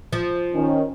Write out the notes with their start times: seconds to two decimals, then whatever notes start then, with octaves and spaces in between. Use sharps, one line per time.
0.12 F3
0.53 D#3 C#4